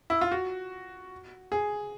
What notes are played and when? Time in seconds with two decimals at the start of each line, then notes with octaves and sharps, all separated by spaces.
0.10 E4
0.21 F4
0.32 F#4
1.52 G#4